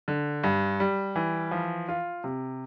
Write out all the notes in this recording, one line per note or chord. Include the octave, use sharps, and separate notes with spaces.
D3
G2
G3
E3
F3
F4
C3